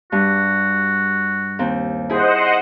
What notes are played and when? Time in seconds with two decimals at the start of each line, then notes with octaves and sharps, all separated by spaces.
0.12 G2 F#4
1.59 D#2 C4
2.10 E4 G#4 C5 D#5 F#5